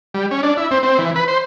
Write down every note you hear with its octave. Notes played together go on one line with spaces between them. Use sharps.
G3
C#4
D4
E4
C4
C4
E3
B4
C5